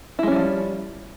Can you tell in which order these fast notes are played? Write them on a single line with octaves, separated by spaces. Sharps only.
E4 G#3 C#4 G3 F3